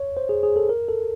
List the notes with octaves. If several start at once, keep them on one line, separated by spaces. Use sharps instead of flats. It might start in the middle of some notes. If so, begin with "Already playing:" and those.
Already playing: C#5
C5
G#4
G#4
A4
A#4
A4